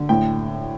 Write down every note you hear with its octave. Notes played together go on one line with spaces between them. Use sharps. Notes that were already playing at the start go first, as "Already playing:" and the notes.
Already playing: D3
A2 G5